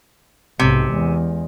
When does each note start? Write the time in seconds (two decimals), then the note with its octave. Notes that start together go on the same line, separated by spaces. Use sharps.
0.59 B1 G#2 C3
0.93 E2 G#3